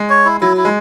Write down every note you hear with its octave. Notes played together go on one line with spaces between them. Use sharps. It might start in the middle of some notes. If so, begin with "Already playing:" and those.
Already playing: G#3
C#5
E4
F#3 E4
E4
G#3